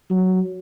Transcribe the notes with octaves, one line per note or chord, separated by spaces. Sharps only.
F#3